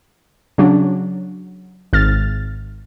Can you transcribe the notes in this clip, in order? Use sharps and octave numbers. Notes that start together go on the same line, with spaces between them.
C#3 F#3 D4
G#1 F6 A6